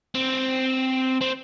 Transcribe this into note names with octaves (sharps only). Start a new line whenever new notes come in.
C4
C4